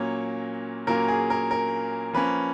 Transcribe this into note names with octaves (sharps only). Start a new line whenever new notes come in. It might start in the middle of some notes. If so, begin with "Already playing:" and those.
Already playing: A#2 F#3 A#3 C#4 C#5
A#2 F#3 A#3 C#4 A#4
G#4
A#4
A#4
F3 A#3 C#4 B4